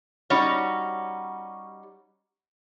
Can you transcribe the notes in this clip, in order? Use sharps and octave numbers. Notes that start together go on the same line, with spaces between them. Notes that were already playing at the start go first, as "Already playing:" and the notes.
G3 C#4 D#4 F#4 C#5